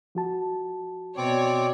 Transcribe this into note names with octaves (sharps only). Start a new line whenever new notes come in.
F3 F#4 A5
B2 C4 C#5 D5 D6